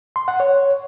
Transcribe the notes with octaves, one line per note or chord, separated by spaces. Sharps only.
C6
F#5
C#5